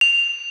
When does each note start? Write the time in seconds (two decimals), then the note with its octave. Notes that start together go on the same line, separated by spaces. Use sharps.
0.01 F7